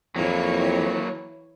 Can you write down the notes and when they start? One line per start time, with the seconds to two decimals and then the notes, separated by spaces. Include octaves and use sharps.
0.16 F2 E3 F#3 A#3 C#5